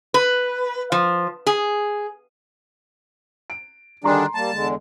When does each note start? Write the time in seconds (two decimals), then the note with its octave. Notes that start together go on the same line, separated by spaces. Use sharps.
0.14 B4
0.92 F3
1.47 G#4
3.50 D7
4.04 D3 D#3 G3 D4 G#4 A#5 C6
4.34 G3 A#3 A5
4.52 E2 D3 G#3